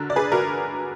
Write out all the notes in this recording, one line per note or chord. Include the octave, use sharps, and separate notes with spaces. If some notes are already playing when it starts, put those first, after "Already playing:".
Already playing: D3 F#4 A#4
D5
G#4 B4
F#4 A#4